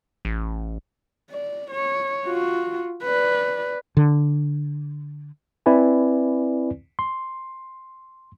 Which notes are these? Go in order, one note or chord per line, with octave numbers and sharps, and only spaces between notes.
A1
D5
C#5
F4 F#4
B4 D5
D3
C4 E4 B4 D5 G#5
C6